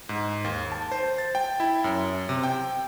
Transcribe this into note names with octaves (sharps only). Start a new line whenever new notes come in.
G#2
D#2
A5
C5
A6
G5
E4
F#2
C3
G5